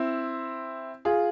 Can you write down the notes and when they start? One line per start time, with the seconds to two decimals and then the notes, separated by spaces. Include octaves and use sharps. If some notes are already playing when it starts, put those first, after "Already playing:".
Already playing: C4 E4
1.05 F4 G#4